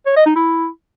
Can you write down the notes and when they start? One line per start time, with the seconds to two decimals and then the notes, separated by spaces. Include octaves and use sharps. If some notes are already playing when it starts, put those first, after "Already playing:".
0.06 C#5
0.16 D#5
0.26 D#4
0.36 E4